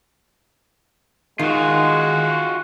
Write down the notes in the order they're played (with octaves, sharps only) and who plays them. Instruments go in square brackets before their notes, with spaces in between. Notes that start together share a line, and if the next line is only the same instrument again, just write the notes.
[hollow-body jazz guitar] D#3 [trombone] G#3 [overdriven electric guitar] F4 F#4